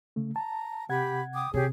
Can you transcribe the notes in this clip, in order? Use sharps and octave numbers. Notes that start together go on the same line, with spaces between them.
C#3 A3
A5 A#5
C3 G4 F#5 B5 G#6
G5 D6 D#6
C3 G4 G#4 C#5